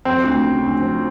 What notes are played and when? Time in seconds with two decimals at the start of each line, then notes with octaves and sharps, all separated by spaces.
0.05 F3 C4
0.24 D2
0.44 C#3
0.62 D2
0.81 F3